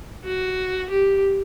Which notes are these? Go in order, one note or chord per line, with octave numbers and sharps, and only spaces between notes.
F#4
G4